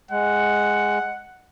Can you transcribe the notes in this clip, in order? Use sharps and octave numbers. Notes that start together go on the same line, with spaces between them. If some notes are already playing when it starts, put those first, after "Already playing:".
G#3 F#5